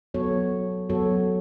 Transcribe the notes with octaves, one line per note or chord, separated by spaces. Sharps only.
F#3 B3 F#4 A4 C#5
F#3 B3 F#4 A4 C#5